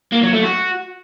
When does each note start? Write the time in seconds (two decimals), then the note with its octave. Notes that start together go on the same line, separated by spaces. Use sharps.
0.12 A#3
0.22 F#3
0.33 A3
0.43 F#4